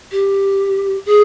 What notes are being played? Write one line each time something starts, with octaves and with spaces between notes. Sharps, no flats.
G4
G#4